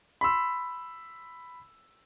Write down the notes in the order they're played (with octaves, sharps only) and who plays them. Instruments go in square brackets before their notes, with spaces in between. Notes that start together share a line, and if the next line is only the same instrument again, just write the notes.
[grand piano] B5 C6 E6